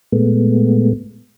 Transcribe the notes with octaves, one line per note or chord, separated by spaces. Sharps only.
A#2 G#3 A3 B3